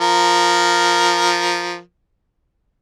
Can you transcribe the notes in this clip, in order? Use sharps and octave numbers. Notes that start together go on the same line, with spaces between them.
F3 A#4